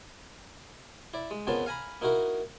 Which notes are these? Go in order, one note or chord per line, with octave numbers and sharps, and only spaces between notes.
E4 D5
G#3
F2 C#3 A#3 B3 F4 A5
F5 G#5 A#5 B5
A#3 D#4 E4 F#4 A#4